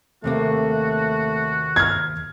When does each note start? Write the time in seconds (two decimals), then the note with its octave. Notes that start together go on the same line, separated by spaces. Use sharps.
0.24 D#2 C3 A3 A#3 F#4
1.76 F6 G#6